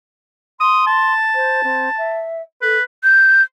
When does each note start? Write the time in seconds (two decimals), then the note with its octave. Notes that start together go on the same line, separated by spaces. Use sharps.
0.60 C6 D#6
0.86 A5
1.34 C5
1.63 C4
1.98 E5
2.62 A4 B4
3.04 G6